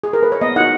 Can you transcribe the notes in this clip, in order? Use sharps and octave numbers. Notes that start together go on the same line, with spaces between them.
G#4
A#4
B4
C#5
B3 D#5
D#4 F#4 F#5